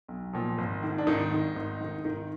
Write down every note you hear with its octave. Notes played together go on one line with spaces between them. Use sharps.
B1
A#2 F3
G#1
G#2 D#3
D4
G#1 D#3 D#4
G#2 D#3
G#1
G#2 D#3
G#1 D#3 D#4